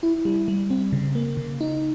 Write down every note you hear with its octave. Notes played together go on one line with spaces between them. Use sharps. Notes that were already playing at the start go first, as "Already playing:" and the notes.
E4
G3
G3
C4
C#3
A#3
C#3
D#4